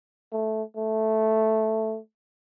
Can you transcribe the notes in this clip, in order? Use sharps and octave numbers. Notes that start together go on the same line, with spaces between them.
A3
A3